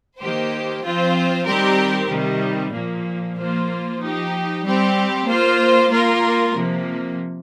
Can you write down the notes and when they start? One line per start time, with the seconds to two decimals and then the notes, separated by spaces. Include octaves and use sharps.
0.18 D#3 A#3 G4 C5
0.83 F3 C4 F4 C5
1.46 D#3 G3 C4 G4 A#4
2.09 C3 D#3 G3
2.72 A#2 F3 A#3
3.36 F3 A#3 F4 C5
3.99 F3 D#4 G4
4.63 G3 C4 G4
5.26 A#3 F4 C5
5.89 A#3 F4 A#4
6.53 C3 F3 A#3